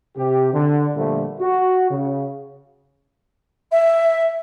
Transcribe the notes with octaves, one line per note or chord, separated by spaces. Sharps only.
C3 G4
D3
A#2 D3 F3 G3 A3
F#4
C#3
E5